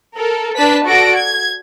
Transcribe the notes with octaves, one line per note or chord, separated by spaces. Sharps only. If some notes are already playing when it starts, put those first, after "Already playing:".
A4 A#4
D4 B4 A5 B6
F#4 A4 D5 A#6 D7
G#6